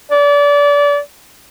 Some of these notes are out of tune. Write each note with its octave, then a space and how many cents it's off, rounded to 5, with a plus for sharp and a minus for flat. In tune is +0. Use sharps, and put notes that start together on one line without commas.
D5 -30